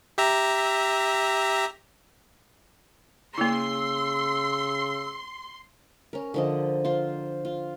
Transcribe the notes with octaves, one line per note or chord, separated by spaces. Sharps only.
G4 E5 A#5
C#3 A#3 E4 C6 E6
C#4 A#4
D3 F3 D#5
F4 C5
F4